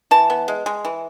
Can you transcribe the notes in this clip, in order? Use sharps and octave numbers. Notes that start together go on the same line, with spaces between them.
E3 A5
B3
G#3
G#3
E3